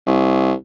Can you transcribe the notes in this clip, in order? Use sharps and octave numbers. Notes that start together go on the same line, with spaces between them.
C2